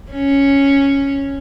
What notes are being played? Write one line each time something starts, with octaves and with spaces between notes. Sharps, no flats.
C#4